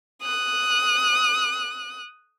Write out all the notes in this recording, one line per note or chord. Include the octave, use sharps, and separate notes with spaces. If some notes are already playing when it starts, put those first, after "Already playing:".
D#6 F#6